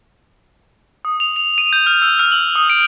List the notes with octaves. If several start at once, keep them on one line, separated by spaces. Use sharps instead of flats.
D#6
F7
F7
D#7
G6
F6
E6
F6
F#7
D#6
D7